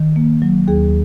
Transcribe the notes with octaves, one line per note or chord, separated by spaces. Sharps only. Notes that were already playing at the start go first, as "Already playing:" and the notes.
Already playing: D#3
A#3
F#3
D#2 G#4